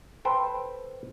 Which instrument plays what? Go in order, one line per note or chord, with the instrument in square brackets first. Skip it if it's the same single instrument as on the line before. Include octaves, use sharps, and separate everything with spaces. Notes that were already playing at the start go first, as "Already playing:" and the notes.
[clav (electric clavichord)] A4 B4 C5 G5